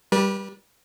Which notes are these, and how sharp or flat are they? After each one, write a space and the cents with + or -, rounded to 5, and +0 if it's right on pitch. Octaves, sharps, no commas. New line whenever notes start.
G3 +0 B4 -35